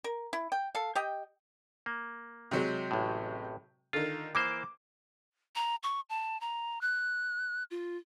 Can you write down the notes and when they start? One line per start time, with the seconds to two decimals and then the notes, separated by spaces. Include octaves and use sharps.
0.04 A#4
0.33 E4
0.52 G5
0.75 A4 F5
0.95 G4 D#5 G5
1.86 A#3
2.51 C3 F#3 G#3
2.91 A1 A2
3.93 D3 D#3 F4
4.35 E3 A#3 C5 D6
5.55 A#5
5.83 C#6
6.10 A5
6.41 A#5
6.81 F#6
7.71 F4